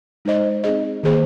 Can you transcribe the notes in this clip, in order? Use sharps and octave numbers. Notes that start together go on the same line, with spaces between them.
G#3 D#4 C5 D#5
C4 D#4 G#4 D#5
D#3 A#3 G#4 C5 D#5